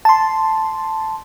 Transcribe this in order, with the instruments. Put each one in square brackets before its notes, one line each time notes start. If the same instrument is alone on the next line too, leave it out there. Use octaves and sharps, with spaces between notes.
[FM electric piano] A5 C6